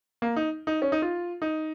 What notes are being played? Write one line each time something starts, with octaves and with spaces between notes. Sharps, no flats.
A#3
D#4
D#4
C#4
D#4
F4
D#4